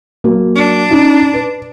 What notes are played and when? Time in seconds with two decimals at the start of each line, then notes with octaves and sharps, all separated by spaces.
0.24 F#3 A#3
0.55 D4
0.90 C#4 D#4
1.34 B4